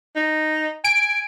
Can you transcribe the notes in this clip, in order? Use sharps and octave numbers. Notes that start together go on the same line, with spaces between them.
D#4
G#5 D7